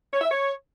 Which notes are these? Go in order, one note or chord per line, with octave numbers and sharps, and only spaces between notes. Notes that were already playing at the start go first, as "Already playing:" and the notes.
C#5
E5
C#5